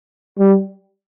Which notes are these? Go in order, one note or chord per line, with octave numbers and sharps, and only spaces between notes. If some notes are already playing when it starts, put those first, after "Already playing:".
G3